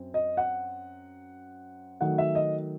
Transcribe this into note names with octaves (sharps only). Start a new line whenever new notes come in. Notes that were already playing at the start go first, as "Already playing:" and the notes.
Already playing: F#2 C4
D#5
F#5
D#3 F#3 A3 F#5
E5
D#5